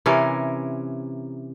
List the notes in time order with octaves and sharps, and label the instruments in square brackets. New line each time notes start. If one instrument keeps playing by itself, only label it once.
[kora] C3 E3 C#4 A#4